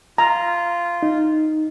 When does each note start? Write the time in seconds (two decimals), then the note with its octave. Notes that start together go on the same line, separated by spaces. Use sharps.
0.18 F4 A#5
1.03 D#4